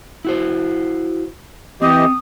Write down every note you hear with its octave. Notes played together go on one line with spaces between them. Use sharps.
E4 F#4 C5
E3 C4 G4 D#5 D#6